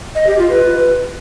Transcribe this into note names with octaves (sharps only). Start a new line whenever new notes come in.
D#5
G4
F4
B4